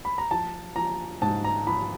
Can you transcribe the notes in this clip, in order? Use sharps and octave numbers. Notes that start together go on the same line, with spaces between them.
B5
A#5
F3 A5
F3 A#5
G#2 A5
A#5
F3 B5